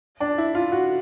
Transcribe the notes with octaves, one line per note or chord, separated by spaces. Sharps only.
D4
E4
F4
F#4